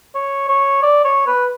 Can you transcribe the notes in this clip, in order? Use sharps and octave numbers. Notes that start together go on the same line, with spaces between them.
C#5
C#5
D5
C#5
B4